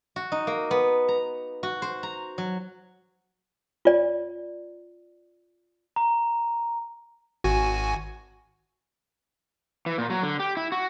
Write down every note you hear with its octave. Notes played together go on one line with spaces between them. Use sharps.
F#4
D#4
A#3
B3
A#5
F#4
C5
A#5
F#3
F4 D5
A#5
G#1 F#4 G#5
E3
A#2
F#3
D3
G4
E4
F#4